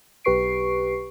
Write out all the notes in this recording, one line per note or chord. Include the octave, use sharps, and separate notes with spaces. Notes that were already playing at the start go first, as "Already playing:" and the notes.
B1 G4 B4 C#6 C7 D7